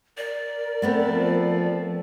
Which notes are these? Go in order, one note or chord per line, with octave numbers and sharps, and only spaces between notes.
A#4 D5
A3 B3 C4
F3